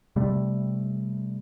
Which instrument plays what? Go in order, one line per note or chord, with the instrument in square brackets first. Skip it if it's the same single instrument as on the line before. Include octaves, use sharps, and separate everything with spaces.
[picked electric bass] C3 G3 A3